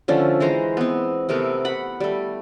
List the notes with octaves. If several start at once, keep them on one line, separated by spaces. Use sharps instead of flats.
D3 F3 A3 C#4
E3 G#3 C5 A#5
B3 C4
C3 A3 B3 A#4
F#5 B5
G3 A3